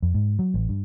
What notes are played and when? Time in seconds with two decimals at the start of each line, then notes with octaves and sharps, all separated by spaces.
0.02 F2
0.14 G#2
0.39 F#3
0.54 A1
0.69 G2